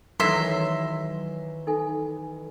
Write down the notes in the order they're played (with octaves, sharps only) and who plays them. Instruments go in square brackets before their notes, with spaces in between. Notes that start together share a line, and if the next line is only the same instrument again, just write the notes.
[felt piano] D#3 E3 A#6 [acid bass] F#3 [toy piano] A4 [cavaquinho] E5 C6
[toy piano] D#4 A4 G#5